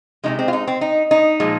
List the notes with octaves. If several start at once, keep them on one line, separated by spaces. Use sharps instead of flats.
C3 F3 G#3 D#4
C4
F4
D#4
C4
D#4
D#4
A#2 F3 G#3